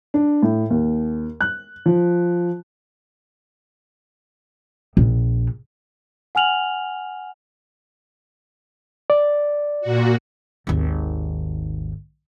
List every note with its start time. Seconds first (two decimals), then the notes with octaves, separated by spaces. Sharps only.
0.14 D4
0.43 A2
0.70 D#2
1.41 F#6
1.86 F3
4.97 A#1
6.35 F#5 G#5 F6 F7 F#7
9.10 D5
9.81 A#2 F#4
10.67 G#1 D#2